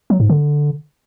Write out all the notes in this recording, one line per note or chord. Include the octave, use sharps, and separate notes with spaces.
F#3
G#2
D3